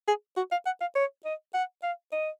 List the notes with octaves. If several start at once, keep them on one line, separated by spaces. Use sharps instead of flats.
G#4
F#4
F5
F#5
F5
C#5
D#5
F#5
F5
D#5